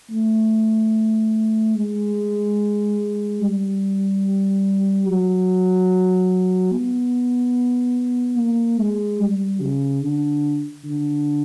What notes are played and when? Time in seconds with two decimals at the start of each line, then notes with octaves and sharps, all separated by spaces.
0.11 A3
1.75 G#3
3.41 G3
5.06 F#3
6.72 B3
8.37 A#3
8.79 G#3
9.20 G3
9.61 C#3
10.02 D3
10.85 D3